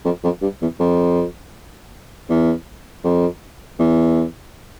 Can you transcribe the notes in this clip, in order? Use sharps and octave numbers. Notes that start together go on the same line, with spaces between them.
F2
F2
G2
E2
F2
E2
F2
E2